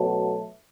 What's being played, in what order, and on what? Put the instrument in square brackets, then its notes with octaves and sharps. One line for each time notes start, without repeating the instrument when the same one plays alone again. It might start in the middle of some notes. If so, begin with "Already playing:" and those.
Already playing: [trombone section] B2 F#3 A3